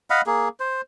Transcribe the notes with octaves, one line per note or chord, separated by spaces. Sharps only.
D#5 F5 F#5 B5
A#3 G#4
C5